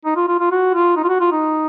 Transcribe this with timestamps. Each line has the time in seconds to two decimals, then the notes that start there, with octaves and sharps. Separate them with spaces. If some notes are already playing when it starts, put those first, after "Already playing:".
0.05 D#4
0.16 F4
0.28 F4
0.39 F4
0.51 F#4
0.74 F4
0.97 D#4
1.04 F4
1.08 F#4
1.20 F4
1.32 D#4